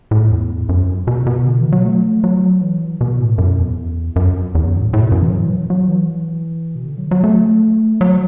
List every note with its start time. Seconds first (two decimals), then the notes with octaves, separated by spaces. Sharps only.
0.11 A2
0.31 E2
0.69 F#2
1.07 B2
1.26 B2
1.46 D3
1.59 E3
1.72 F#3
1.85 A3
2.24 F#3
2.61 E3
3.01 B2
3.20 A2
3.38 F#2
3.58 E2
4.16 F#2
4.55 E2
4.67 F#2
4.80 A2
4.93 A2
5.02 B2
5.12 F#2
5.22 E3
5.31 F#3
5.44 E3
5.57 F#3
5.70 F#3
5.89 E3
6.76 B2
6.85 D3
6.98 F#3
7.11 F#3
7.24 A3
8.01 F#3